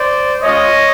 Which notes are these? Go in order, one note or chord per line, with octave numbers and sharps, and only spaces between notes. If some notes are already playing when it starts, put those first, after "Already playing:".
Already playing: C5 D5
G#3 C#4 F4 C#5 D#5